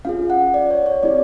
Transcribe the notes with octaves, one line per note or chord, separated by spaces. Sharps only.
C#4 F4 G#4 F5
F#5
D5
C#5
C#5
C4 E4 G4 D5